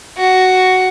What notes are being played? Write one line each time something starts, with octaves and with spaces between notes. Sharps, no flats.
F#4